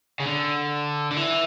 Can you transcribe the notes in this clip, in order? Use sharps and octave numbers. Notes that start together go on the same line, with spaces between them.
C#3
D3
D3
E3